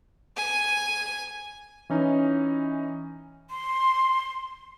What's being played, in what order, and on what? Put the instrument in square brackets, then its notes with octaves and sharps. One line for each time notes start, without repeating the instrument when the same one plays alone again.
[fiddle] G#5
[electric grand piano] E3 C#4 D#4
[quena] C6